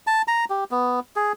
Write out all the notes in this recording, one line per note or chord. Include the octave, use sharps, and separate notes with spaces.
A5
A#5
G4
B3
G#4